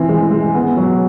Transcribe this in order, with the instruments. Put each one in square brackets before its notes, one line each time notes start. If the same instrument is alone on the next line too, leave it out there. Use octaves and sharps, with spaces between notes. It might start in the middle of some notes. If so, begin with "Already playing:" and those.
Already playing: [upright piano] E3 C4
G#3
G#3
B3
F#3